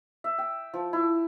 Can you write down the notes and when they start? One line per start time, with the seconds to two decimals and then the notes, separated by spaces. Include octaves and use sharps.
0.24 E5
0.38 G5
0.74 F3
0.93 E4